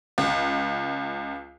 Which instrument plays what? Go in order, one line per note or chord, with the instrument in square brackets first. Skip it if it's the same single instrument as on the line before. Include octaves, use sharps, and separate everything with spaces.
[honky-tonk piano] C#2